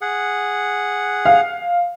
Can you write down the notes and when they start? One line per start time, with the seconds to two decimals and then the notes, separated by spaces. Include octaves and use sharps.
0.01 G#4 F#5
1.25 F5